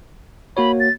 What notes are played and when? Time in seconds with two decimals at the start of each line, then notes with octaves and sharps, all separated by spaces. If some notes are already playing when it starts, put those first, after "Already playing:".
0.57 A#3 F#4 C#5 B5
0.80 A6